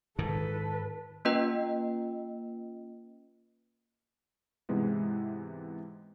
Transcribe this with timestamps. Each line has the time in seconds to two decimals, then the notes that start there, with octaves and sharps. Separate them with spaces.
0.19 G#2 D#3 A4 B4
1.25 A#3 C#4 F4 B4 D#5 G5
4.69 G#2 C3 E3 G#3 B3